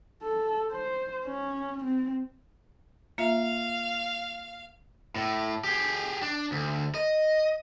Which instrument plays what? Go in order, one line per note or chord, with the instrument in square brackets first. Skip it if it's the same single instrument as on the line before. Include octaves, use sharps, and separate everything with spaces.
[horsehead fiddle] A4
C5
C#4
C4
[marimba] A#3 F4 E5 [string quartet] F5
[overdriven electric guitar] A2
G4 G#4
D4
D2
D#5